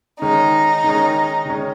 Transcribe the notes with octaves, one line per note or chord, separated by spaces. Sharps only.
D#3 G#3 C#4 D#4
D#3 G#3 C#4
D#3 G#3 C#4